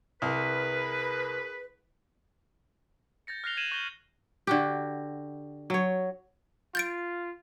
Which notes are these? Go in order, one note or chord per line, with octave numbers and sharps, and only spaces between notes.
C2 G#4 A#4 B4
G6 A6 A#6 C#7
F6 F#6 A#6 C7 F7 G7
G#6 C7 D#7 E7 F#7 G7
C#6 G6 A6 A#6 G7
D3 F#4 G4
F#3 C#5
F4 G6 A6 D7